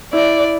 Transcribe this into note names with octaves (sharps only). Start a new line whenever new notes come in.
E4 D5